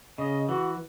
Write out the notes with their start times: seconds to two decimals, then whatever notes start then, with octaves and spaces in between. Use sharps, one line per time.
0.18 C#3 D#5
0.49 E3 F#4